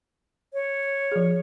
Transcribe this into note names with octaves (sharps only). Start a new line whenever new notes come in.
C#5
F3 G#4